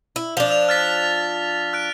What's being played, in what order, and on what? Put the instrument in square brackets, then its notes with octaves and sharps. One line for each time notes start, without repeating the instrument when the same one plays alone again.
[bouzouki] E4
[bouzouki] F3 D4 [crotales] F7 G7
[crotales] E6 F7
F6 A6 B6
F6 F#6 D7